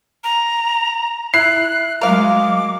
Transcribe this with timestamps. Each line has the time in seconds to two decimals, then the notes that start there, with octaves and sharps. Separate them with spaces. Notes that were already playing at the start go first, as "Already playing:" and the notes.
0.24 A#5
1.34 E4 F#6 C7
2.01 F#3 G#3 A#4 F5 D6